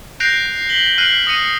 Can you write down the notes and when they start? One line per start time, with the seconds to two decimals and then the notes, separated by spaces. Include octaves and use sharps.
0.20 F#6 G6 A#6 C7 D7 F7
0.69 B6 F#7 G7
0.98 F6 F#6 C7 D7 D#7 F#7
1.27 D#6 A#6 C#7 D#7